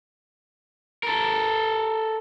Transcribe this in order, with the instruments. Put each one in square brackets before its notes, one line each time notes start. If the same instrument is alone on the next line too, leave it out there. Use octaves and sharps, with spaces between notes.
[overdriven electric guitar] A4 A#4